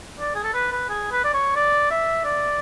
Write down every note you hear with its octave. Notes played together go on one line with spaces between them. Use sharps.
D5
G#4
A4
B4
B4
G#4
B4
D5
C#5
D5
E5
D5